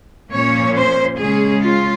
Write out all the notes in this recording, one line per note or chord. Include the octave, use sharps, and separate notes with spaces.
A#2 F3 A#3 C#4 C#5
C5
C#3 G#3 C#4 G#4
F4